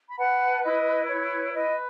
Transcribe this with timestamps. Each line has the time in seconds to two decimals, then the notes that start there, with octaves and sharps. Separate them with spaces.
0.10 B5
0.19 B4 F#5 A5
0.63 E4 D#5
1.09 B4 C#5
1.54 B4 D#5